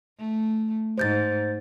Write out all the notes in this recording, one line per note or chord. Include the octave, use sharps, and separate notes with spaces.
A3
G#2 C5 G6 A6